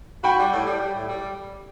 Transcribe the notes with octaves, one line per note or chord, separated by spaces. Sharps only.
F#4 G5 B5
G3
A2
G3
G3
A2
G3